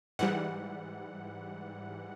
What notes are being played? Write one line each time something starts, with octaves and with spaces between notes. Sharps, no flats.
G#2 E3 G3 F#5